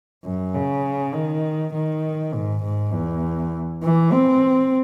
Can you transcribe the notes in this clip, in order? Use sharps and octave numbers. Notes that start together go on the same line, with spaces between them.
F#2
C#3
D#3
D#3
G#2
G#2
E2
E3
C4